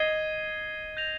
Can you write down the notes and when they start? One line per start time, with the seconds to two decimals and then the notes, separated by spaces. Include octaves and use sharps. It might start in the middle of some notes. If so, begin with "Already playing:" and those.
Already playing: D#5 G#6 C7 D#7 G7
0.97 G6 A#6 F7